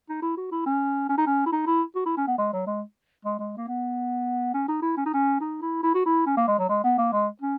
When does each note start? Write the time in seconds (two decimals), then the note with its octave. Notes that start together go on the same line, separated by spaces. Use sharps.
0.09 D#4
0.22 E4
0.37 F#4
0.52 E4
0.66 C#4
1.09 C#4
1.18 D#4
1.27 C#4
1.46 E4
1.52 D#4
1.67 E4
1.96 F#4
2.06 E4
2.17 C#4
2.27 B3
2.38 G#3
2.53 F#3
2.67 G#3
3.25 G#3
3.39 G#3
3.57 A#3
3.68 B3
4.54 C#4
4.68 D#4
4.82 E4
4.97 C#4
5.06 D#4
5.14 C#4
5.41 D#4
5.62 E4
5.83 E4
5.95 F#4
6.06 E4
6.26 C#4
6.37 A#3
6.48 G#3
6.59 F#3
6.69 G#3
6.84 B3
6.98 A#3
7.13 G#3
7.42 C#4